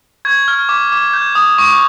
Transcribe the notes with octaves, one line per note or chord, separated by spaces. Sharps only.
C#6 G#6
F6
D6
D6
G6
D#6
C#6